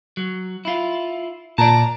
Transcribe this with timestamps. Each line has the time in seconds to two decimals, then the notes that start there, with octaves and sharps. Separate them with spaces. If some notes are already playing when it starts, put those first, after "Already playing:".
0.17 F#3
0.65 E4 F4
1.58 A#2 D5 A5 A#5